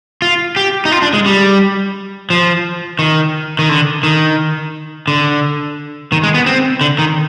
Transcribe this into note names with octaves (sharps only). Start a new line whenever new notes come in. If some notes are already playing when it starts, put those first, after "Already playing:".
F4
G4
D#4
F4
D4
G#3
G3
F3
D#3
D#3
D3
D#3
D3
D#3
G#3
B3
C4
D3
D#3